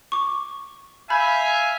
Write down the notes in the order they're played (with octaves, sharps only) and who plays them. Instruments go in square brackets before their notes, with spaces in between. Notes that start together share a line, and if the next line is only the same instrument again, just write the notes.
[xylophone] C#6 D6
[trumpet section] E5 F5 G#5 [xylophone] B5 G6